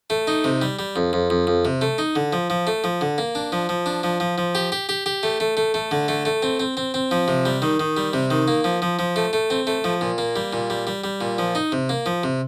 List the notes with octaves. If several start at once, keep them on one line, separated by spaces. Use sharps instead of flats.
A3
D#4
C3
G3
G3
F2
F2
F2
F2
C3
A3
D#4
D3
F3
F3
A3
F3
D3
A#3
D4
F3
F3
D4
F3
F3
F3
G4
G4
G4
G4
A3
A3
A3
A3
D3
A3
A3
C4
C4
C4
C4
F3
C3
G3
D#3
D#3
G3
C3
D#3
A#3
F3
F3
F3
A3
A3
C4
A3
F3
A#2
A#3
G3
A#2
G3
G3
G3
A#2
F3
D#4
C3
A#3
F3
C3